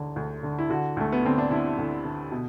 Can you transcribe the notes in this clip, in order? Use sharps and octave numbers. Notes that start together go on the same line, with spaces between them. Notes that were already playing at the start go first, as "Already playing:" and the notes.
Already playing: E1 D2 D3
D2
D3
E4
D3 F#4
D2 A3
B3
D3 C4
D4
D3 E4
D2
D3
B2